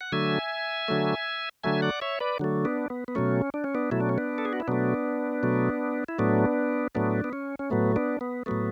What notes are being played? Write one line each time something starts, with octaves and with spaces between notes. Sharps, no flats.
F#5
D3 F#3 A3 E5 G#5
D3 F#3 A3
D3 F#3 A3 E5 G#5
D5 F#5
C#5 E5
B4 D5
D3 F#3 A3
B3 D4
B3
B3
B2 F#3 A3 C#4
D4
C#4
B3 D4
B2 F#3 A3 E4
D4
C#4
B3 D4
A4
G#4
F#4
E4
B2 F#3 A3 B3 D4
B2 F#3 A3
E4
A2 F#3 A3 B3 D4
A2 F#3 A3 B3 D4
B3
C#4
C#4
A2 F#3 A3 B3
B3 D4
B3
A2 F#3 A3 B3